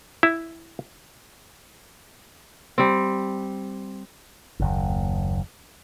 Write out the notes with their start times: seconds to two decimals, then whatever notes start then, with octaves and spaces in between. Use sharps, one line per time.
0.23 E4
2.78 G3 C4
4.60 F#1 D#2